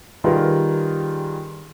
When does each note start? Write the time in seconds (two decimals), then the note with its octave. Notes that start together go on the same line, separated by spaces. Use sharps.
0.24 D#3 G3 F4 G#4 A#4 B4